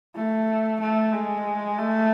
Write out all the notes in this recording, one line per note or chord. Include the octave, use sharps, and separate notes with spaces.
A3
A3
G#3
A3